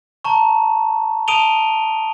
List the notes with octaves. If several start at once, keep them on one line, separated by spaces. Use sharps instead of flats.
A5 A#5 C#6
A5 D#6 D7 D#7 F7 G7